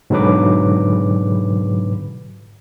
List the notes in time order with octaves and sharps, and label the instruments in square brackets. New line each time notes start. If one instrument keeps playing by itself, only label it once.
[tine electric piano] G#2 B2 D3 F#3 B4 D6